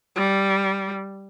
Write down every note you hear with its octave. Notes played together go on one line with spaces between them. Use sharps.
G3